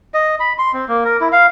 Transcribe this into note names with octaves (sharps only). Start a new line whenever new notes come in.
D#5
B5
C6
C4
A#3
A#4
E4
F5